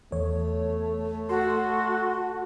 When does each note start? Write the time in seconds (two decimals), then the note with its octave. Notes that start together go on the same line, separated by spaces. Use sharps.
0.12 E2 A3 C#5
1.29 F#4 A4 C6